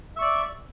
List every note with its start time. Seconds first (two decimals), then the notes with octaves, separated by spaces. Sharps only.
0.16 E5
0.19 C#6
0.22 D5